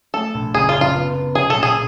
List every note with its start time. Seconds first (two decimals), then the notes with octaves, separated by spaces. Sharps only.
0.14 A3 A4
0.34 A#1
0.54 F#1 G#4
0.69 F4
0.75 F#1
0.81 F4
0.95 B3
1.15 B3
1.35 B1 G#4
1.50 A4
1.57 A#2
1.63 G#4